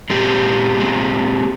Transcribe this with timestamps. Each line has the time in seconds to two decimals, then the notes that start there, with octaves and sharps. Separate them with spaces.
0.10 A#2 G#3 C4 G4
0.77 A#2 G#3 C4